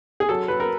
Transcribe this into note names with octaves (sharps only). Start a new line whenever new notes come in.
G#4
F#3 A4
F#3 B4
A#4